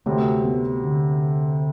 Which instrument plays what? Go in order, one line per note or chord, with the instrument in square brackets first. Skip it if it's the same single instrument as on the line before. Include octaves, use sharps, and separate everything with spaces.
[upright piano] D2 C3 F#3 C4 [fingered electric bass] A3
[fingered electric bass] B3
D3